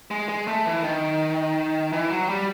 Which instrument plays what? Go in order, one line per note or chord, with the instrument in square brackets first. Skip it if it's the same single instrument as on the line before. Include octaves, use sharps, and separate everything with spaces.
[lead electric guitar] G#3
G#3
A3
E3
D#3
E3
F#3
G3